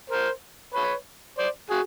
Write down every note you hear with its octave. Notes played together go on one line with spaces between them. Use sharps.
A#4 C5
B4 C#5
C5 D5
F#4 G#4